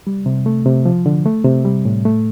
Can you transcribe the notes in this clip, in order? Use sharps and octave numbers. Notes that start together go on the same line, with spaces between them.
G3
C3
A3
C3
F3
D3
A3
C3
G3
A2
A3